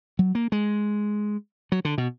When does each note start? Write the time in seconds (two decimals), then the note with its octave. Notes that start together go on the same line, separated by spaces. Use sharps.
0.19 F#3
0.35 A#3
0.52 G#3
1.72 F#3
1.85 D3
1.98 B2